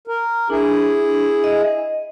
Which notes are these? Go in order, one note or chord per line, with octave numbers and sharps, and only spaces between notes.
A#4
D4 E4 G#4
D#5